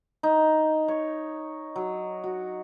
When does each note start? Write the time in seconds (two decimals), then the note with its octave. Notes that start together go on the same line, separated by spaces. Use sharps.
0.23 D#4
0.88 C#5
1.76 F#3
2.24 F#4